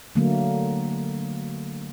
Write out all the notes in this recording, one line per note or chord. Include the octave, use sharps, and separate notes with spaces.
D3 F#3 A3 A#3